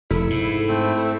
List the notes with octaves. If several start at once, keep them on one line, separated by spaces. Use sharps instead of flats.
F1 E4 A4
G#2
A3 C4
A4